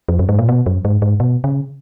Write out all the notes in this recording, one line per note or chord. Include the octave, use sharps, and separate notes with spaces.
F2
F#2
G#2
A#2
B2
F#2
G#2
G#2
B2
C#3